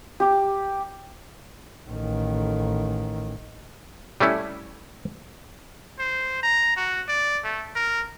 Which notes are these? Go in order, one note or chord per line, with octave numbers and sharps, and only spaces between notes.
G4
A1 D#3
G3 A3 C#4 E4
C5
A#5
F#4
D5
A3
A#4